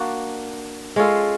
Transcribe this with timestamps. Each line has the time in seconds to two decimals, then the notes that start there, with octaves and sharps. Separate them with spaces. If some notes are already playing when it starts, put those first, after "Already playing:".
Already playing: A#3 D4 F#4
0.96 G#3 C#4 F4 A4